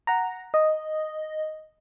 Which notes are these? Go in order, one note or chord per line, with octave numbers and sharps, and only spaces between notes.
F#5 A#5
D#5